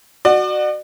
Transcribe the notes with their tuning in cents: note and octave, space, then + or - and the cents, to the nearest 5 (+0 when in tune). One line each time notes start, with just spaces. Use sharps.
F#4 +0 D5 +40